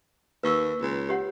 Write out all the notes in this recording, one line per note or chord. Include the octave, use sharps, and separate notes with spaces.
D#2 B4 C#6 E6
C#2
G4 C#5 F#5